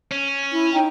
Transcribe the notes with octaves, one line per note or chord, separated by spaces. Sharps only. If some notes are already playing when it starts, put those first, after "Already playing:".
C#4
E4
D#4 G5